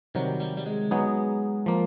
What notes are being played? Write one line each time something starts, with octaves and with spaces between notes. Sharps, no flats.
C3 D#3 F#3 G3
G3
G3
G#3
F#3 B3 D#4 G#4
F3 A#3